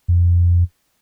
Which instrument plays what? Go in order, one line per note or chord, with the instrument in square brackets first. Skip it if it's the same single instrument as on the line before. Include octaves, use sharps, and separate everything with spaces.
[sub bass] F2